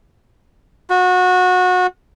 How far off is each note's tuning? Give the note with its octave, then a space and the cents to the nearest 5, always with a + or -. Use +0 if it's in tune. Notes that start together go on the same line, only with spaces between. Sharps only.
F#4 -25